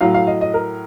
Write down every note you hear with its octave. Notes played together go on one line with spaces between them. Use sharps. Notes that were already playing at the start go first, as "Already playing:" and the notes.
A2 F#3 F5
F5
D#5
D#5
A#4